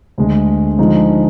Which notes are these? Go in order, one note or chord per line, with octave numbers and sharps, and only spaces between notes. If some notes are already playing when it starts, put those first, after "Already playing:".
D2 D3 G#3
D3 F3 G#3 D#4